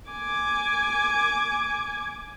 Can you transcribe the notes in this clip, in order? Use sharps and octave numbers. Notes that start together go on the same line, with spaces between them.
G#5 D6